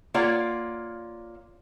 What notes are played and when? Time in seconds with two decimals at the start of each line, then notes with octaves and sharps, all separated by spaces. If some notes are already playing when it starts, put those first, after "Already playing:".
0.14 A#3 F4 C#5 D5 F#5